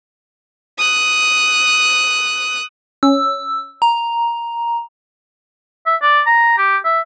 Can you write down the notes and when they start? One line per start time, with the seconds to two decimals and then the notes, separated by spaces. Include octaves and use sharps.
0.78 D#6 F#6
3.03 C#4 E6
3.82 A#5
5.86 E5
6.02 D5
6.26 A#5
6.58 G4
6.85 E5